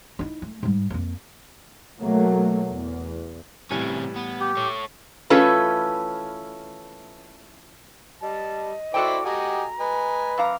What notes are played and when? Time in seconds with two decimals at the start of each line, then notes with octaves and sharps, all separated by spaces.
0.19 D#4 E4
0.42 A3
0.63 G#2 G3
0.90 F2 A#3
2.00 B2 F#3 A3 A#3
2.69 E2
3.70 A2 C3 E3 G3 C#4
4.16 B3
4.41 G4
4.57 A4 C#5
5.30 E3 A3 C#4 F4 A4 B4
8.22 G3 D#5 A5
8.94 E4 F#4 A4 C5 D5 G5
9.25 G4 D#5 F#5 G#5 A#5
9.80 B4 D#5 G#5
10.38 F#2 F5 A#5 D6